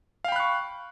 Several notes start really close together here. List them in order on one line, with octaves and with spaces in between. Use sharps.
F5 G5 B5 F#6 C#6